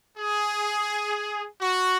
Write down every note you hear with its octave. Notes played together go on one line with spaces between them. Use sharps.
G#4
F#4